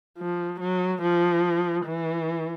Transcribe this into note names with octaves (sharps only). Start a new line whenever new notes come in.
F3
F#3
F3
E3